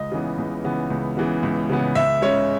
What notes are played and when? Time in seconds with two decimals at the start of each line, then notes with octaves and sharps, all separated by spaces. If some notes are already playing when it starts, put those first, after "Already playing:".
Already playing: C#2 D#5
0.12 C#3 E3 B3
0.38 C#2
0.64 C#3 E3 B3
0.90 C#2
1.17 C#3 E3 B3
1.43 C#2
1.70 C#3 E3 B3
1.95 C#2 E5
2.22 C#3 G#3 C#4 C#5